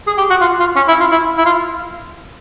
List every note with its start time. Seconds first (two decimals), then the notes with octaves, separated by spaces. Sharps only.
0.07 G#4
0.18 G4
0.30 F#4
0.41 F4
0.59 F4
0.76 C#4
0.88 E4
1.00 F4
1.11 E4
1.38 E4
1.46 F4